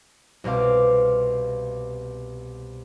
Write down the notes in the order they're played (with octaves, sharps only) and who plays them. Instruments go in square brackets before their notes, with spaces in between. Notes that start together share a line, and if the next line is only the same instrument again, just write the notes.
[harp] C2 B2 C4 F5 D6